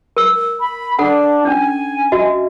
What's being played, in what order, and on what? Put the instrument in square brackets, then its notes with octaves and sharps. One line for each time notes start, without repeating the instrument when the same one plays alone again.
[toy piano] A#4 E6
[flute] B5
[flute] D4 [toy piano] A4 F#5
[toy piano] C#4 D4 [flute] G#5
[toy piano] F#4 D#5 E5